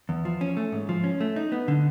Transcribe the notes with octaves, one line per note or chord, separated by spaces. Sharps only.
E2
F3
C#4
A3
G#2
F3
C#4
A3
D#4
B3
D3